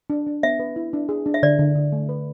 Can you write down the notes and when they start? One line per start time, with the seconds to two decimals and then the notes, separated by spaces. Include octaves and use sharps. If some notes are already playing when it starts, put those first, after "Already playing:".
0.10 D4
0.27 D4
0.43 B3 E5
0.60 B4
0.76 E4
0.93 D4
1.09 G#4
1.26 D4
1.34 E5
1.43 D3 D5
1.59 D3
1.75 D3
1.92 A3
2.09 B4